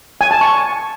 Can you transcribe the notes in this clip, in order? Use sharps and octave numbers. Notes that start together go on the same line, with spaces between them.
G#5
A5
C#6